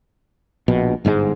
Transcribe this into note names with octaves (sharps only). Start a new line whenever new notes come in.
A#1 B2
G1 G#2 B2 G#3